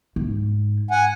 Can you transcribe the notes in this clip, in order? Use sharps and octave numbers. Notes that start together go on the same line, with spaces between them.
G#2
F#5 G#5